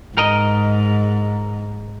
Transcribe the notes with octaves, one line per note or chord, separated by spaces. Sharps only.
G#2 A#4 D#5